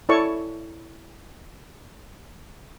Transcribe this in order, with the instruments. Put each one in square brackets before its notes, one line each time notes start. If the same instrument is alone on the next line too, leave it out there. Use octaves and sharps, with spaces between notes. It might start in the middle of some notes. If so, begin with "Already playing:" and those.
[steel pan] E4 A4 C#5 D5 A5 C#6